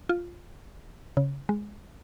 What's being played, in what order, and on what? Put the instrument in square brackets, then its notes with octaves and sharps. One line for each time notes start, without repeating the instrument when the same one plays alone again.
[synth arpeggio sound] F4
C#3
G#3